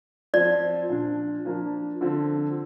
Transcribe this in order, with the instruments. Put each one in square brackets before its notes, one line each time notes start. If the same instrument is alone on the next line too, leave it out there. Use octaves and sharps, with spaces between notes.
[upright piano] F3 C4 [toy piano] D5
[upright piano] A#2 F3 D4
F3 A#3 D4
D3 F3 C4